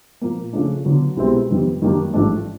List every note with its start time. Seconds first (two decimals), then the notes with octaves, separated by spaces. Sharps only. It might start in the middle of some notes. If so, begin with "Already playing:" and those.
0.21 A#2 F3 A#3
0.53 C#3 F3 A3 D4
0.85 D3 F#3 B3 D4
1.17 C2 B2 G#3 C4 E4
1.49 F2 C3 D#3 G3 B3
1.82 F#2 D#3 G3 A#3 D4
2.14 A1 G#2 F3 A3 D4